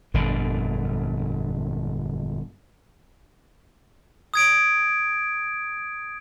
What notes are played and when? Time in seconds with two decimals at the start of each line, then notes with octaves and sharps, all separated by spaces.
0.14 G1 F2 A#2 D3
4.34 D#6 G#6 D7